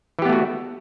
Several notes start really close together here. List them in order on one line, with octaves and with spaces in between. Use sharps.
E3 G4 B3 A3 F#4